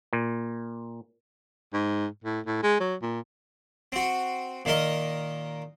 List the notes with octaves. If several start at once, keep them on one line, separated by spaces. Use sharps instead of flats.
A#2
G#2
A2
A2
G#3
F#3
A#2
C4 F#4
A#2 D#3 D#4 A#4 D#5